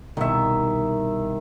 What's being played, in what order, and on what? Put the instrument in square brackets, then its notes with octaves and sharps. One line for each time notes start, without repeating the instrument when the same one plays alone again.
[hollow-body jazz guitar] C2 B2 [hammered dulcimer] D#3 E5